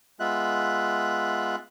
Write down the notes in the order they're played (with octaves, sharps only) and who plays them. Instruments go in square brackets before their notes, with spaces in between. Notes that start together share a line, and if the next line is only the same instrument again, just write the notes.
[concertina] G#3 B3 F4 E5 F#6